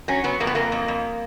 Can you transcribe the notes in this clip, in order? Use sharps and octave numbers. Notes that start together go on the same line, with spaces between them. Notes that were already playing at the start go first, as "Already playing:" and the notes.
F#3 C#4
F#3 B3
F2 A#3
B3
F2 A#3
F2
F2